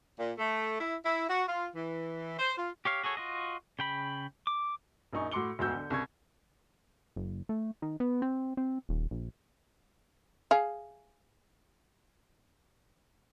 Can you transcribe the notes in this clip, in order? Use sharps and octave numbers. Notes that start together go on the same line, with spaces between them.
A#2
A3
E4
E4
F#4
F4
E3
C5
F4
G4 C#5 F5
F#4 G#4 A4 C#5
F4 F#4 D#5
C#3 G5 B5
D6
A#1 F#2 D#4 C#6
A2 F#4 C6 D6 C#7 G7
E1 D2 G#2 F#4 E6 G6
D3
C2 C#3 C#6 G#6
F#1
A3
D#3
B3
C4
C4
D#1
A#1
G#4 F5